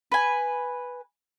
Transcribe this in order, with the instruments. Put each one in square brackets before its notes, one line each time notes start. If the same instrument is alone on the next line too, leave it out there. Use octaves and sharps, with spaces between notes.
[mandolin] B4 G#5